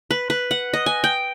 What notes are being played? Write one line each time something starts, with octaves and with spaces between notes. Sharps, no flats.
B4
B4
F#5
D#5
G#5
G5